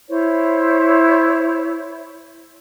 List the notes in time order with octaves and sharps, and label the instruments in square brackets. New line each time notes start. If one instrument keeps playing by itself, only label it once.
[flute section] E4 C5 C#5